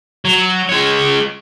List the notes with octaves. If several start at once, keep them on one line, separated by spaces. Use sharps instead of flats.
F#3
G#3 C#5